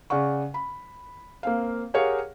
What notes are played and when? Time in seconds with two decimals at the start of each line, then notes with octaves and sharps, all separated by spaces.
0.10 C#3 D5 F#5 C#6
0.54 B5
1.43 A#3 C4 F5
1.94 G4 G#4 A#4 C#5 F5 F#5